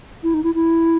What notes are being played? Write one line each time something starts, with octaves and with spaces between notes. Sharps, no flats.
E4
D#4
E4
E4